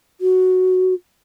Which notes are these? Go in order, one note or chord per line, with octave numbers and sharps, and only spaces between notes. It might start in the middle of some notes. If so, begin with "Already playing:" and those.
F#4